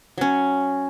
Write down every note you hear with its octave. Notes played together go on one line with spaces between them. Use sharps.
F#3 C#4